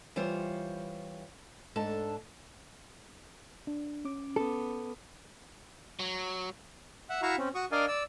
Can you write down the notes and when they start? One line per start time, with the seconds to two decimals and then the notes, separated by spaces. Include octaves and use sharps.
0.16 E3 G3 F4 C5 C#5
1.76 G#2 D4 A4 A5
3.67 D4
4.05 C#4 D6
4.36 B3 A4
5.99 F#3
7.09 E5 F#5
7.22 E4 F#4 E5 F5 A#5 C#6
7.38 C4 C#4
7.55 F#4 C#6 D#6
7.72 D4 A#4 D5 D#5 F5 G#5
7.88 D5 E6